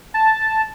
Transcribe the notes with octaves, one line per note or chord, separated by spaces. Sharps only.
A5